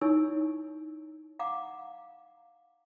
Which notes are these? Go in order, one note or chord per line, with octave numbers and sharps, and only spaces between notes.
D#4 E4 C#5 G#5 C#6 E6
F5 F#5 A#5 D6